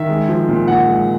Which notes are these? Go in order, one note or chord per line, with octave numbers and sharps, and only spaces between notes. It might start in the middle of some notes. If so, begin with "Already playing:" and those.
Already playing: D#3 E5
G#3
F3
A#2
A#2 F#5
G#3